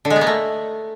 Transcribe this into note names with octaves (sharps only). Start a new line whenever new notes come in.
D3
G#3
B3
A#3
A3